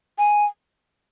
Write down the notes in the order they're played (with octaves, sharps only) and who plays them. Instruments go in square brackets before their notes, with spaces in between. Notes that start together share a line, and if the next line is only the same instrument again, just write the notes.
[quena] G#5